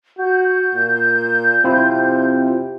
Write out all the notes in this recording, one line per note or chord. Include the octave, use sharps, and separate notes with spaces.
F#4 G6
A#2
C3 C4 E4 F4